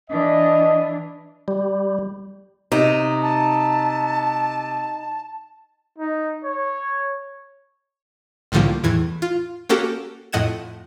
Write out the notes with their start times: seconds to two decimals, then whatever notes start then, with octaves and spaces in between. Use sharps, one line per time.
0.10 E3 D4 D#5
1.48 G3
2.72 C3 D#4
3.22 A5
5.98 D#4
6.44 C#5
8.52 C2 A2 D3 F3 G3 A#3
8.84 E2 A2 E3 G#6
9.22 F4
9.69 A#3 C#4 F#4 G4 A4 A#4
10.33 F2 A2 D#5 F#5 G#6 E7